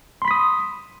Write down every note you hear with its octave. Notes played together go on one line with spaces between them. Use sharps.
B5 C6 D#6 B6